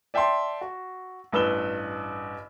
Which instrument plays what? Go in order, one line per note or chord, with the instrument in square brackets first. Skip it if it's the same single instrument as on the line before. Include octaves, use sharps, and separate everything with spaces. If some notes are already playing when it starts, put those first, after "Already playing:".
[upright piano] D5 E5 G5 A5 C6
F#4
A1 G2 B4 E6 E7 G7